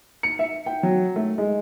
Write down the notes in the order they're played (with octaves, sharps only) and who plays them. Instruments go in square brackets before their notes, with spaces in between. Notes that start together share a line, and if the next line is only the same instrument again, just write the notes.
[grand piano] C#7
E5
G5
F#3
A3
G#3